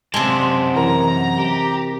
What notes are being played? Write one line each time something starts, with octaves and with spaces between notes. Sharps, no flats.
F#2 C3 G#3 D5 A5
E3 A#4 A#5
G4